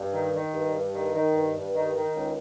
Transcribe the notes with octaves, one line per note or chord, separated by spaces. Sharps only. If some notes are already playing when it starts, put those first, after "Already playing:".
Already playing: G2
D#3
D#3
G2
G2
D#3
D#3
G2
G2
D#3
D#3
C#2